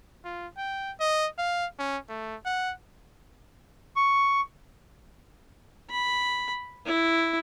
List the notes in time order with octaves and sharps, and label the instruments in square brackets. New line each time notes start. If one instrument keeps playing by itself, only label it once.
[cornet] F4
G5
D#5
F5
C#4
A3
F#5
[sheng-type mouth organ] C#6
[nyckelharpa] B5
E4